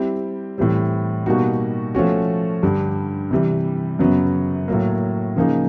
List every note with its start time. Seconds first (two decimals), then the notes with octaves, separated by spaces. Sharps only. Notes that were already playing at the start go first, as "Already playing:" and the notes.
Already playing: G3 C4 E4 G4
0.58 A2 E3 G3 C4
1.26 B2 G3 A#3 D#4 F#4
1.95 F3 A3 C#4 F#4
2.63 G2 D3 G3
3.31 C3 E3 G3
3.99 F#2 C#3 F#3 B3
4.68 A2 F#3 A#3
5.36 C#3 F3 A#3 D#4 G#4